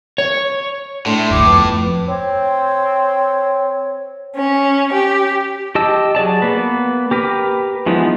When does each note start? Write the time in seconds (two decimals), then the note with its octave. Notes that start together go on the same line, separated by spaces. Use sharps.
0.18 C#5
1.06 A2 A3 D4 C6
1.31 F#1 D2 G2 D6
1.46 F2 B3
2.08 C4 C#5
4.37 C#4
4.93 G4
5.75 G4 D#5 A5 E6
6.15 F#3 G#4 D5 A5
6.42 A#3 B3 B4
7.11 G4 A#4 B4
7.86 E3 F3 G#3 B3 D#4